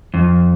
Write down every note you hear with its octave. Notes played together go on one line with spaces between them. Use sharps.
F2